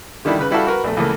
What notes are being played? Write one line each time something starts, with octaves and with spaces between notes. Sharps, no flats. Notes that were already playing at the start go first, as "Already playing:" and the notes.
D3 D#3 G3 D4 E4
C#3 B4
G3 E4 F#4 A4 F5
F#4 A#4 B4
A#1 A3
C#2 E3 A3 A#3